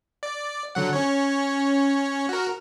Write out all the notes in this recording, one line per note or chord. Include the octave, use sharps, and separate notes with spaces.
D5
D3 F#3 F#5
C#4 C#5
F#4 A#4